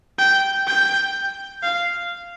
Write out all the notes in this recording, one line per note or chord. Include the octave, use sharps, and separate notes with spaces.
G5
G5
F5